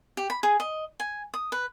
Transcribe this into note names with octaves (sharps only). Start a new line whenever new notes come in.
G4
B5
G#4
D#5
G#5
D#6
B4